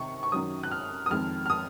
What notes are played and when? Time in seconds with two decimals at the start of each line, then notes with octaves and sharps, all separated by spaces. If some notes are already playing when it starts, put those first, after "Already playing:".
Already playing: C3 D#3 C#6
0.23 C#6
0.32 F#2 D#3 F#3 D#6
0.63 F#6
0.71 F6
1.06 D#6
1.11 F2 D#3 G#3 F6
1.46 F6
1.50 D#6